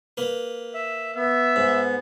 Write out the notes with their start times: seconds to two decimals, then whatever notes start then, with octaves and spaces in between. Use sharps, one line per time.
0.17 A#3 B4
0.74 E5
1.16 B3 E5
1.56 G#2